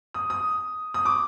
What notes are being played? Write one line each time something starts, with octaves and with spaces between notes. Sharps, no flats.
D#6
D#6
D#6
D6